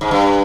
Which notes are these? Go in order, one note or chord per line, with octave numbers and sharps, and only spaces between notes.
G#2
G2